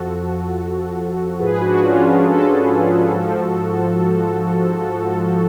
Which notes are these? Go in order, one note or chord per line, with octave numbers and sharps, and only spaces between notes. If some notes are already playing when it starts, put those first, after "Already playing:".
Already playing: F2 F3 F#4 A4
G#2 F3 G#4 B4
D4 F#4
C#4 F4
D4
F#4 A4
G#2 F3